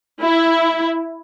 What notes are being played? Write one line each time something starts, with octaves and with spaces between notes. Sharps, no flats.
E4